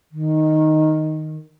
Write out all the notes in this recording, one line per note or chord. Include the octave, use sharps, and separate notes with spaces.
D#3